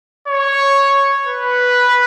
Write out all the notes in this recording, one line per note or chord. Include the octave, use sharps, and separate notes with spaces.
C#5
B4